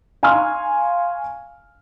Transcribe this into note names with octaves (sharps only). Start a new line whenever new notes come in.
F5 G#5 A#5 C6 C#6 F6